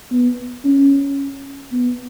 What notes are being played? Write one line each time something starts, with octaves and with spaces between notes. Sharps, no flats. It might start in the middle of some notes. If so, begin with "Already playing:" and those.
B3
C#4
B3